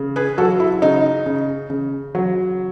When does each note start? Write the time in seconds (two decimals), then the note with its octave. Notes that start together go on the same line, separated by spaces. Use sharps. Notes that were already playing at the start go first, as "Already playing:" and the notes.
Already playing: C#3
0.16 G#4 B4
0.38 F#3 F#4 A4
0.60 E4
0.82 C#3 D#4
1.26 C#3
1.70 C#3
2.15 F#3